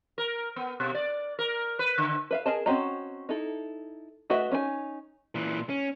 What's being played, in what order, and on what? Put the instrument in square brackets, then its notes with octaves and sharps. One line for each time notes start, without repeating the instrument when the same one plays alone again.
[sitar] A#4
B3
B2
D5
A#4
B4
D3
[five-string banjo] B4 E5 F5
G#4 A#4 D#5 A5
C4 C#4 F#4 D#5 A#5
D#4 E4 A4
A3 F#4 B4 D#5 E5
C#4 D#4 E4 G#5
[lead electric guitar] A#2 E3
C#4